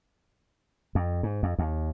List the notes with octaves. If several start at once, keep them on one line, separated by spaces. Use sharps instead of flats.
F2
G#2
F2
D#2